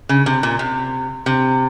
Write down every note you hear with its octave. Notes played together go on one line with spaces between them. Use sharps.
C#3
C3
A#2
C3
C3